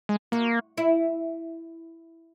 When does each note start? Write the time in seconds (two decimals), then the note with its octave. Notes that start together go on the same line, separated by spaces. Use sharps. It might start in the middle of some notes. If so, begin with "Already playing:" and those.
0.09 G#3
0.32 A#3 F#4
0.77 E4